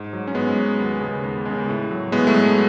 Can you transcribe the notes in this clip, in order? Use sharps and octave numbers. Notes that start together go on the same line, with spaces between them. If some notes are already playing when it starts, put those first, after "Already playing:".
Already playing: G#2
F#3
C#4
G#2 G#3 B3
F#3
D#2
C#3 G#3
D#2
C#3 G#3
A2
F#3
A2 G#3 B3
A3
F#3
G#3